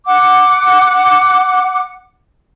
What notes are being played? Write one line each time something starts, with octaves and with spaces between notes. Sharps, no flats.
F#5 D6